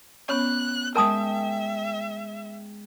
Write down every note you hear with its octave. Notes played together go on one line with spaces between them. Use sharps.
B3 C#4 C#5 F#6
G#3 A#4 E5 G5 A5 D#6